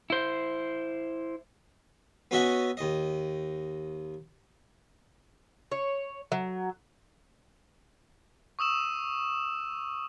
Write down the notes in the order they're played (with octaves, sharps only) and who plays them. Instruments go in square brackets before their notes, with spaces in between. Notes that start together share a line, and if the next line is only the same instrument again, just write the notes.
[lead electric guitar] E4 C5
[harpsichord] B3 C#4 F#4 D#5 E5 F#5
D#2 D#5
[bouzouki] C#5
F#3
[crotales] C#6 D#6 E6 E7